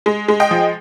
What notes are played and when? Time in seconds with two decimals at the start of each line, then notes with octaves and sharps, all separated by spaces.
0.06 G#3
0.28 G#3
0.40 D#5 G5
0.51 F3